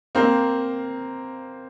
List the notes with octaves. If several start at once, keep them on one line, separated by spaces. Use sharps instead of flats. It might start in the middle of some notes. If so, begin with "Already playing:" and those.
A#3 C4